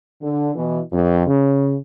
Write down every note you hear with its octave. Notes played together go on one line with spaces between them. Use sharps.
D3
B2 E3
F2
C#3